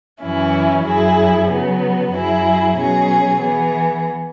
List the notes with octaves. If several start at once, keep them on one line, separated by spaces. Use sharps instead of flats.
F#2 E3 C#4 E4
F#2 F#3 E4 G#4
C#3 F#3 B3
F#2 F#3 E4 G#4
B2 F#3 C#4 G#4
E3 B3 G#4